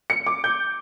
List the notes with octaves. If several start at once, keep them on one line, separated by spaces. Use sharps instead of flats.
C#7
D6
G6